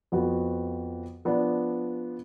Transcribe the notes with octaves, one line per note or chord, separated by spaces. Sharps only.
F2 F3 B3 F#4
F3 B3 D4